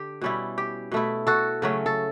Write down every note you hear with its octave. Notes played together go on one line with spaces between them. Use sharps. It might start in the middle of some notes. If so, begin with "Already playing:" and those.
Already playing: D3 G4
B2 G3 C#4 E4
G4
B2 A3 E4
F#4 A4
C#3 F#3 A3 C#4
A4